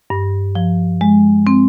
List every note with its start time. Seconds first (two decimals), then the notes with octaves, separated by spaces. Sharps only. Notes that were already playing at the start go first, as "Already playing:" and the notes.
0.10 G2
0.55 F3
1.01 G#3
1.47 C4